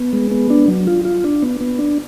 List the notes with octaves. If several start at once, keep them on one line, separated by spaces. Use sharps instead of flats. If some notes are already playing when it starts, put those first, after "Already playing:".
Already playing: B3
G#3
B3
D4
F#3
F4
F4
D4
B3
B3
D4